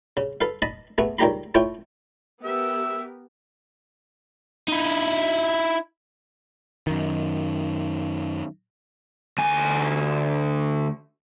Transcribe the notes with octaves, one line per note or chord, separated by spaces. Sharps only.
C#3
A4 B4 F5
D#5 A5 B5
A3 B3 G#4 F#5
C#2 D#3 G3 G4 A#5 B5
A3 E4 F4 C#5 G5
B3 G4 A#4 E5
D#4 E4
F#2 D#3
D2 G#5